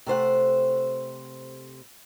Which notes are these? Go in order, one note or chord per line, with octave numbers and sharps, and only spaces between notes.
C3 A3 C5 F#5